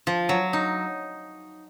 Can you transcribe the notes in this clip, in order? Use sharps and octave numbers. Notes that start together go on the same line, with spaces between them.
F3
F#3
D#4